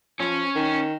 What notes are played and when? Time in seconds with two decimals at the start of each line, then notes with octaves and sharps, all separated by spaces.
0.20 F3 C#4 C#5
0.55 D#3